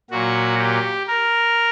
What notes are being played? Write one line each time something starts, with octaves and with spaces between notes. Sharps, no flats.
A#2 F#3 F#4
G4
A#4